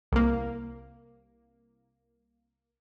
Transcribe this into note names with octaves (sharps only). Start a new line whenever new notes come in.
C2 A#3